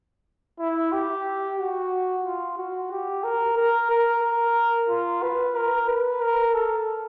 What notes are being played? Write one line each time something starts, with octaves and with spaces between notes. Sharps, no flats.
E4
G4
F#4
F4
F#4
G4
A#4
A#4
A#4
A#4
F4
B4
A#4
B4
A#4
A4